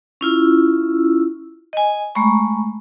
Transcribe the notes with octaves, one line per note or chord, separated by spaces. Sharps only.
C#4 E4 F4 E6
D#5 G#5
G#3 A3 A#5 B5 C#6